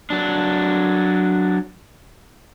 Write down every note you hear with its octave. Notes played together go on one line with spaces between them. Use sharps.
F#3 D4